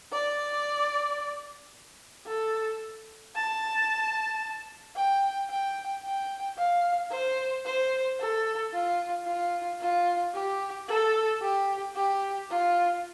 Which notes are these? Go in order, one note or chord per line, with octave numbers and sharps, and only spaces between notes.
D5
A4
A5
G5
G5
G5
F5
C5
C5
A4
F4
F4
F4
G4
A4
G4
G4
F4